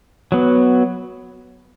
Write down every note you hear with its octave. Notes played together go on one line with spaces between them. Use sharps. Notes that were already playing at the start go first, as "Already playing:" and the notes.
F#3 B3